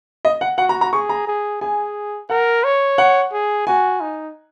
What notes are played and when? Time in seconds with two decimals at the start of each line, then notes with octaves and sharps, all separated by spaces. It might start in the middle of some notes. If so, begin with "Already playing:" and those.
0.25 D#5
0.41 F#5
0.58 F#4 F#5
0.69 A#5
0.81 A#5
0.93 G#4 C#6
1.09 A#5
1.27 G#4
1.61 G#4 G#5
2.30 A#4 F#5
2.64 C#5
2.98 F#5
3.32 G#4
3.67 F#4 G#5
4.01 D#4